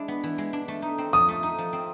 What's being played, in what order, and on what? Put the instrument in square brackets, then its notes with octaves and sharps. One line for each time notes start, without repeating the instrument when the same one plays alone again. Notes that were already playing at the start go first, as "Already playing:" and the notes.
Already playing: [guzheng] G#3 D4 E4
B3
E3
G#3
D4
A3
D#4
C4
[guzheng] F3 [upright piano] D#6
[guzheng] A3
D#4
F3
C4